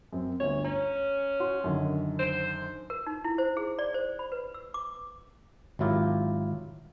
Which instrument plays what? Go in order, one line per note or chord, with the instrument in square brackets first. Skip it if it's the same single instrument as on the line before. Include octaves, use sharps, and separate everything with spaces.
[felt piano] F#2 C4
[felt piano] G1 D2 [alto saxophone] C#5
[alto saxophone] C#4 [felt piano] A#5
[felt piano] F#4 C6
F#2 D3 D#3
[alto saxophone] C5
[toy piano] A#4
D#4
E4
C5
G#4
D5
C5
B5
B4
E6
D6
[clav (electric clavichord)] G#1 F#3 E4 F4 G4 A#4